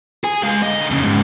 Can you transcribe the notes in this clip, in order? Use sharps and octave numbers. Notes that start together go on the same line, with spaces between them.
G#4 G#5
G#3 F5
D3 D#5
F2 C#3
G#2 C#3